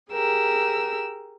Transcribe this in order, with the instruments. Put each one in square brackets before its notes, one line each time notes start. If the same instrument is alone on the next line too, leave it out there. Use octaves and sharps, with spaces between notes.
[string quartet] G4 G#4 A#4 E6